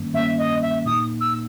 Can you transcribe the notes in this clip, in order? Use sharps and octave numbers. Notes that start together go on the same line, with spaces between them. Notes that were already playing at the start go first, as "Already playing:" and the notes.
Already playing: G2 D#3 G3 A#3 C#4
G2 D#3 G3 A#3 C#4 E5
D#5
E5
A#2 A#3 D#4 D#6
E6